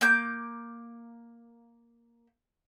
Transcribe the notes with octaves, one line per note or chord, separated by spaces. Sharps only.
A#3 D6 G6